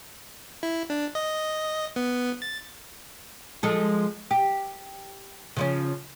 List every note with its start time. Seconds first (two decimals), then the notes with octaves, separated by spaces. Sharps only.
0.63 E4
0.90 D4
1.15 D#5
1.96 B3
2.42 A6
3.63 F3 G#3 A4
4.31 G4
5.57 C#3 F3 C#4